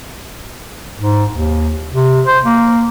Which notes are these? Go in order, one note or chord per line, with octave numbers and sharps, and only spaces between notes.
G#2
D#2
C3
C5
A#3